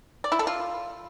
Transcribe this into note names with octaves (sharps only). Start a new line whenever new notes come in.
D5
E4
A4
F4